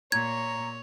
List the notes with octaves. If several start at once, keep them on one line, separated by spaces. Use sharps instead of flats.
A#2 C#5 A#5 G#6